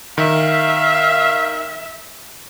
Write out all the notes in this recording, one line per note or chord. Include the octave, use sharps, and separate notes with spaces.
D#3 E5 F5